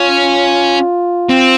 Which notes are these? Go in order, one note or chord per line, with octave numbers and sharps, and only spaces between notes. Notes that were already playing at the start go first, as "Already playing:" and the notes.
Already playing: C#4 F4
C4